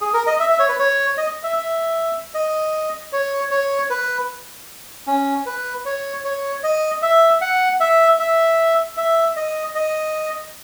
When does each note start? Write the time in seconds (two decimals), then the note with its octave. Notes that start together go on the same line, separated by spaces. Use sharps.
0.01 G#4
0.14 A#4
0.27 D#5
0.40 E5
0.50 E5
0.59 C#5
0.69 B4
0.79 C#5
1.17 D#5
1.43 E5
1.57 E5
2.34 D#5
3.13 C#5
3.51 C#5
3.90 B4
5.07 C#4
5.46 B4
5.85 C#5
6.24 C#5
6.63 D#5
7.02 E5
7.41 F#5
7.80 E5
8.19 E5
8.97 E5
9.36 D#5
9.75 D#5